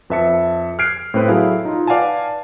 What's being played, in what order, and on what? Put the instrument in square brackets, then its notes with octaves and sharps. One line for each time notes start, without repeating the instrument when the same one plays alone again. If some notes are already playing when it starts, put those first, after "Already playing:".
[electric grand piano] F2 B4 E5 A5 C#7
F6 F#6 G#6 C7 D7
A2 C4 B4
F#3 E4 G#4 A4 F5
D#4 F4
B4 D5 F5 F#5 G#5 A5